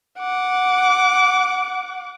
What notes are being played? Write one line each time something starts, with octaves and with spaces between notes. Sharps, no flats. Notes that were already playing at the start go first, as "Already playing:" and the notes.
F#5 D6